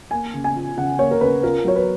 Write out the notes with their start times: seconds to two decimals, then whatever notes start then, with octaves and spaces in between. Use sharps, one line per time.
0.11 A#3 G#5
0.34 C#3
0.44 G#5
0.55 F3
0.77 C#3 F#5
0.99 A#3 C#5
1.11 A#4
1.21 C#3 B4
1.43 F4 A#4
1.65 F#3 C#5
1.76 B4